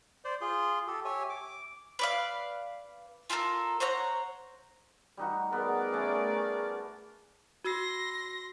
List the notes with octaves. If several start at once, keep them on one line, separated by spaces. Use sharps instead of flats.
C5 D5
F4 G#4 C6
G4 A4
G4 C#5 E5 G#5
D6
B4 D5 F5
F4 G4 A4 A#4
C5 C#5 F#5 A#5
G3 D#4 F#4
B3 G#4 A#4 D5
A3 C#4
F#4 C6 E6 A#6 C7